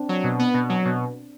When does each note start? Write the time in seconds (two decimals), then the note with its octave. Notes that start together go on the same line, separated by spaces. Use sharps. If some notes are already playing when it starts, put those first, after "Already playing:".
Already playing: C4 D4
0.09 F#3
0.24 B2
0.39 B3
0.54 B2
0.69 F#3
0.85 B2